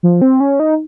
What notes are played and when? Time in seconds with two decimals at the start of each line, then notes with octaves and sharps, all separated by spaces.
0.03 F3
0.22 C4
0.40 C#4
0.60 D#4